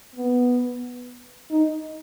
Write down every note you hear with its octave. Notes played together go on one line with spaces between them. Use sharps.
B3
D#4